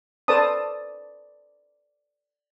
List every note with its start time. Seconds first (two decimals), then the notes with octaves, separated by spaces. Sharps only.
0.28 A4 B4 C5 D5 A5 D#6